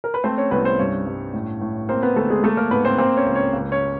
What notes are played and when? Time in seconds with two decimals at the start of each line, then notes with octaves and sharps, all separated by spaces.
0.04 A#4
0.14 B4
0.24 A3 C4 C5
0.37 C#4 C#5
0.51 C2 B3 B4
0.65 C4 C5
0.78 G2 C#4 C#5
1.06 G2
1.34 A2
1.61 A2
1.89 A#3 C4 C5
2.02 B3 B4
2.16 D2 A3 A4
2.30 G#3 G#4
2.43 A3 A#3 A4
2.57 A#3 A#4
2.71 G#2 B3 B4
2.85 C4 C5
2.98 A#3 C4 C5
3.17 C#4 C#5
3.26 C#2
3.35 C#4 C#5
3.53 C#2
3.72 C#4 C#5